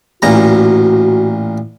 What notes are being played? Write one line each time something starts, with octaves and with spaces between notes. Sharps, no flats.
A1 A#2 F#4 A#5